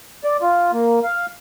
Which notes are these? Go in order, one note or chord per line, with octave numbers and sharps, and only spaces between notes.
D5
F4
A#3
F5